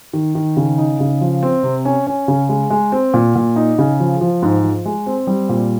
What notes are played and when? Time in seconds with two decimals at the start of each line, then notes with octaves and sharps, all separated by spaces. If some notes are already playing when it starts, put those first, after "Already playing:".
0.13 D#3
0.35 D#3
0.57 C#3
0.78 D#4
1.00 C#3
1.21 F3
1.43 C4
1.63 C3
1.85 C#4
2.07 C#4
2.28 C#3
2.49 G#3
2.70 G#3
2.92 C4
3.14 A#2
3.36 A#2
3.56 D#4
3.79 C#3
4.00 F3
4.21 F3
4.42 G#2
4.64 F3
4.86 G#3
5.06 C4
5.27 G3
5.49 A#2